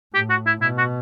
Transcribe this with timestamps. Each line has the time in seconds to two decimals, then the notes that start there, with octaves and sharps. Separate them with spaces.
0.14 A2 G4
0.30 F#4
0.47 E4
0.62 B2 E4
0.78 F#4